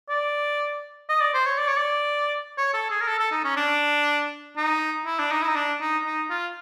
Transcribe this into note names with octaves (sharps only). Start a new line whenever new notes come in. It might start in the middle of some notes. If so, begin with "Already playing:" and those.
D5
D#5
D5
C5
C#5
D5
C#5
D5
C#5
A4
G#4
A#4
A4
A4
D#4
C#4
D4
D#4
E4
D4
D#4
E4
D#4
D4
D#4
D#4
F4